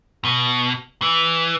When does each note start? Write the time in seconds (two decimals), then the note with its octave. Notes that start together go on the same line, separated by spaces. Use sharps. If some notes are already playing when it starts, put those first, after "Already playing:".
0.25 B2
1.02 E3